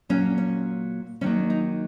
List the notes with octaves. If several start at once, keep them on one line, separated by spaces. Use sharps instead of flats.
A#2 F#3 A#3 C#4
C#4
D#3 F#3 A#3 C#4
D#4